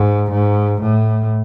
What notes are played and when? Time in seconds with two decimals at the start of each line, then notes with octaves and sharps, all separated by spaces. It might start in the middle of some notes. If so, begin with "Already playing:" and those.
Already playing: G#2
0.32 G#2
0.81 A2